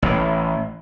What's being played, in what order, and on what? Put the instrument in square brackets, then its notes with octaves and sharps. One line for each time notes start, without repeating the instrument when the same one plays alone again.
[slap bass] A1 A2 E3